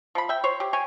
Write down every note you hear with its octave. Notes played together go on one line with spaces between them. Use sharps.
F3 B5
E5 G5
C5 C#5
G4
C#5 G5 G#5